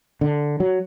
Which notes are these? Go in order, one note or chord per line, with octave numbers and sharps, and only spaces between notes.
D3
F#3